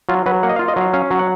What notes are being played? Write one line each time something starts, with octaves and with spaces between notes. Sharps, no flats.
F#3 F4
F#3 B4
A#3 F#5
D#5
F5
F4
D#5
F#3 F5
C#4 F5
F#3
F#5